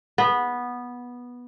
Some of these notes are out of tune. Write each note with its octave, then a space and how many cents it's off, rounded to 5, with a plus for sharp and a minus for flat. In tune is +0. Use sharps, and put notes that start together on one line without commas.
B3 -10